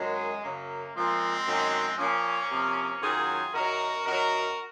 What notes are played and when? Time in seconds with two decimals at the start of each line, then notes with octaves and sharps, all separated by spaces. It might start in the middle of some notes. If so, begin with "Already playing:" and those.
Already playing: F#2 D#3 F#3 G#3
0.42 F#2 C#3 F#3 A#3
0.94 A#2 F3 G#3 C4
1.46 F#2 D#3 F#3
1.98 A#2 F3 A#3 C#4
2.50 C3 F3
3.01 F#2 D#3 F#3 F4 G#4
3.54 F#2 D#3 F#3 F#4 A#4
4.05 F#2 D#3 F#3 F#4 A#4